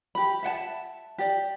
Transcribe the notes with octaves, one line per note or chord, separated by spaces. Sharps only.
G4 B5
E5 F#5 G5 A5
G4 D5